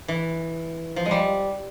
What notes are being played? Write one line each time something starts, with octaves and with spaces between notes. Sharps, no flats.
E3
F3
G#3
G3